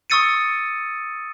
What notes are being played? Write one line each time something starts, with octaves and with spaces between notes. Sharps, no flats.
C#6 D#6 E6 A6 C#7 D#7